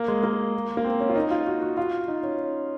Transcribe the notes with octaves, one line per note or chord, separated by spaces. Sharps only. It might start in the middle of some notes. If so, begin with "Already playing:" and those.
Already playing: A#3
G#3
A#3
A#3
C4
C#4
F4
D#4
F4
F#4
F#4
F4
D#4
C#4